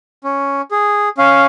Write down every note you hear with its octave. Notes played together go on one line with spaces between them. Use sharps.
C#4
G#4
C#4 F5